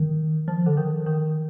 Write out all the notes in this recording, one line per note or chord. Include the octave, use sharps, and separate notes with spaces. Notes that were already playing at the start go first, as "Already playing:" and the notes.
Already playing: D#3
F3
D3
D#3
D#3